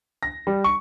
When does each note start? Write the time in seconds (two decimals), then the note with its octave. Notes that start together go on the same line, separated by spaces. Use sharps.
0.23 A#6
0.47 G3
0.64 C#6